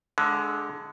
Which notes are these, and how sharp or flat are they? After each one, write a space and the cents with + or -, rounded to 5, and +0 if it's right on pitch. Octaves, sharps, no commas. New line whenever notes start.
D3 +0 G#3 +20